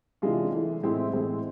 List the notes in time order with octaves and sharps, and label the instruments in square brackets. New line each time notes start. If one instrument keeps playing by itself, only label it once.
[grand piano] C3 E3 G#3 D4 F4
E3 A3 E4
A2 G#3 C4 E4
A2 E3 G#3 C4 E4